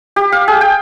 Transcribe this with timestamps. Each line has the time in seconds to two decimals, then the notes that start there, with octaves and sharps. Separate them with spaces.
0.16 G4
0.32 F5
0.48 G#4
0.61 G5